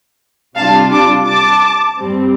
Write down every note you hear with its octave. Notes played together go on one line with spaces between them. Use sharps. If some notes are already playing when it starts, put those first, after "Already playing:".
C3 G3 D4 F4 F5 A5
A5 D6
A5 D6
G2 G3 C4